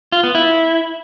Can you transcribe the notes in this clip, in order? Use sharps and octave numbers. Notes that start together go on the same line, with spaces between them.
F4
B3
E4